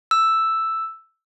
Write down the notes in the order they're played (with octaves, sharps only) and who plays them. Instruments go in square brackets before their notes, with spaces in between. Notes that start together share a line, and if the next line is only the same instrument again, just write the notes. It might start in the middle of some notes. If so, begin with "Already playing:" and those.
[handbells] E6